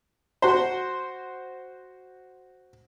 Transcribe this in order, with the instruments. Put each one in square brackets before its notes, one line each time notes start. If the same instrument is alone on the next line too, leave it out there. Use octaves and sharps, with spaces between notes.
[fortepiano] F#4 C5